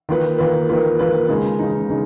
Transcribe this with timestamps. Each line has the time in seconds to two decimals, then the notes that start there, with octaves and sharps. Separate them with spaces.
0.09 D#3 A#3 F4 B4
0.38 D#3 A#3 F4 B4
0.69 D#3 A#3 F4 B4
0.99 D#3 A#3 F4 B4
1.29 C#3 G#3 D#4
1.59 C#3 G#3 D#4
1.90 C#3 G#3 D#4